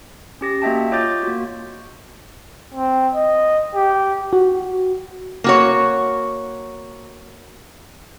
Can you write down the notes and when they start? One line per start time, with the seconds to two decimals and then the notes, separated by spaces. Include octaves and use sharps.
0.41 C#4 G4 A#6
0.62 A#3 F#4 D#5 E5 G5 A5
0.92 F4 C#5 D#5 D6 G6 A6
1.23 A#3 F#4
2.74 C4
3.15 D#5
3.75 G4
4.33 F#4
5.44 A#3 F#4 C#5